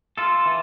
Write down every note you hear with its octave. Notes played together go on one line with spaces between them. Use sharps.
F4 A4
E3